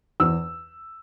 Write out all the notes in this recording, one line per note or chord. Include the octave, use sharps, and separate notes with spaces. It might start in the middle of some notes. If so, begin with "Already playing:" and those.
E2 E6